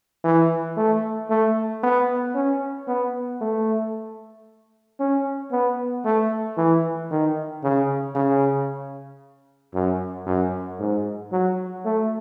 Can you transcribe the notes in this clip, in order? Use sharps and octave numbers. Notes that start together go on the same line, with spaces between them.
E3
A3
A3
B3
C#4
B3
A3
C#4
B3
A3
E3
D#3
C#3
C#3
F#2
F#2
G#2
F#3
A3